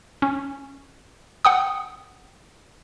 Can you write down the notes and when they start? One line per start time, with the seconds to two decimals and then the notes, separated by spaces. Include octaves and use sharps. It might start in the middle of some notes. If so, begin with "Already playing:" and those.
0.22 C#4
1.45 F#5 G5 D#6